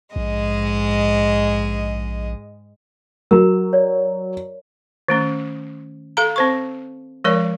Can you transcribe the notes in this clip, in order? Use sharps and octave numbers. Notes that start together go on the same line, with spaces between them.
A#1 G#2 G#3 D#5
F#3 A#4 A#5
C#5 D5
D#3 A3 C#4
A4 F5 A#5
C4 C5 C#6
F3 G#3 A#4 C#5 D5